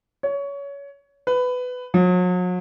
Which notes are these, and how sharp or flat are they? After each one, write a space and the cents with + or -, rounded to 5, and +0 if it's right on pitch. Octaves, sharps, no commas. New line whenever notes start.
C#5 +20
B4 +15
F#3 -40